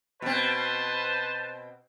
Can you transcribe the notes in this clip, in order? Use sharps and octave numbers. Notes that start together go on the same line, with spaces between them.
B2 C4 B4 C5 A5